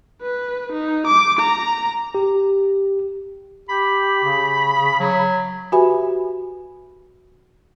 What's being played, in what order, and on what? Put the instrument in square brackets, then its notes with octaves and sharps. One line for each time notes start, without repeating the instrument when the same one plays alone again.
[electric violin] B4
D#4
D6
A#5
[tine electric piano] G4
[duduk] G4 [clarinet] B5
[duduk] C#3
[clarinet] F#3
[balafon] F#4 G4 B4 E5 G#5 B5